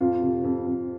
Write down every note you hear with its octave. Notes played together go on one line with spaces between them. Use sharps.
F2 F4
C3
F2
F2